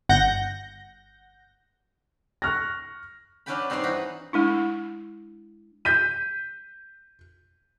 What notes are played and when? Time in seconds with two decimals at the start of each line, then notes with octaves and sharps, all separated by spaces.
0.09 G1 F#5 G6 A#6
2.42 C#6 F6 F#6 A#6
3.46 F#3 C#4 D4 B4 G5 B5
3.70 G2 C4 D#4 C5 D5 C6
3.83 E3 D#4 F#4 B4 B5
4.33 G#3 D4 E4
5.85 G6 B6 D#7